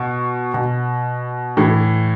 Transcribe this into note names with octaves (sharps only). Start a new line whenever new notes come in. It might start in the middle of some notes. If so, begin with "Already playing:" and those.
Already playing: B2 C#6
B2
A2 E3